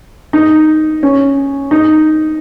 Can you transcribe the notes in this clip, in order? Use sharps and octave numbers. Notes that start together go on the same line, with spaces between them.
D#4
C#4
D#4